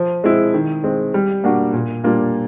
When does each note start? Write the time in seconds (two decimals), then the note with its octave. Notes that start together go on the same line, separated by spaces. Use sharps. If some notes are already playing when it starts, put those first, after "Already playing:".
Already playing: F3
0.24 G#3 C4 E4
0.54 D#3
0.84 G#3 C4
1.14 G3
1.44 A#3 D4 F#4
1.73 A#2
2.04 G3 A#3 D4 F4